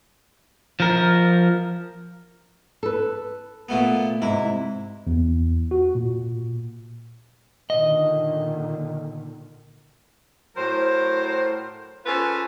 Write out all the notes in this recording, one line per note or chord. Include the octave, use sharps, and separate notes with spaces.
F3 A#4
A4 B4
A#2 A3 B3
G#2 C3 E4
E2
F#4
A#2
A#2 D3 D#3 D#5
A2 F#3 A#4 C5
C#4 F4 G#4 A4 B4 C5